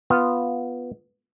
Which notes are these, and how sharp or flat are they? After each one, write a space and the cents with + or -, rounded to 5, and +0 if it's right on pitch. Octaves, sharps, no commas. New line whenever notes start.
B3 +0 F4 +0